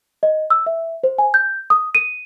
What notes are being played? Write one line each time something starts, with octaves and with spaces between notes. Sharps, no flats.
D#5
E6
E5
C5
G#5
G6
D#6
D#7